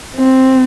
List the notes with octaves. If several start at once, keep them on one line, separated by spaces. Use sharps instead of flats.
C4